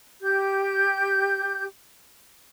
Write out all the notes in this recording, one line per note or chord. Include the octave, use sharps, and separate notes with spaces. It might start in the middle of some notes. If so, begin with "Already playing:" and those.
G4 G6